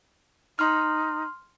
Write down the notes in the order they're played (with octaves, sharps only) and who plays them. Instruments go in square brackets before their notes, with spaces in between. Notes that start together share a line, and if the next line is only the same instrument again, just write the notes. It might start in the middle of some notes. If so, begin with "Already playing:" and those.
[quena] D#4 [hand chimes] C6 F6